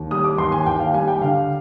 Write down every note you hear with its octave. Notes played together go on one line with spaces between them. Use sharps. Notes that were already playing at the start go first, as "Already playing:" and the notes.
Already playing: D#2
G3 D#6
D6
D#2 C6
G#5
D#2 G5
F5
G3 G#5
G5
D3 F5